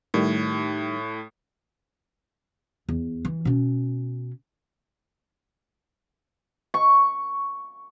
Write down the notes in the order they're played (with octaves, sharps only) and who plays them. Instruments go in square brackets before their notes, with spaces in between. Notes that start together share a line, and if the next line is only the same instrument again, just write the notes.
[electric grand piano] A2 [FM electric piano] D#3 G3
[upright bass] E2
E3
B2 C#4
[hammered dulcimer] C#6